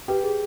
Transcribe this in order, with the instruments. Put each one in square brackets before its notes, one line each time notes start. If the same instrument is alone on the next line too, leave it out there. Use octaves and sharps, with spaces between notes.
[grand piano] G4 [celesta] B4
[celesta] G#4